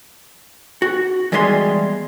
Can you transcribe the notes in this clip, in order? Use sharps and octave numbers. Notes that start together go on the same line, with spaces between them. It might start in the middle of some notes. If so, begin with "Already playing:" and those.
F#4
E2 G3 G#3 G#4 E5 C6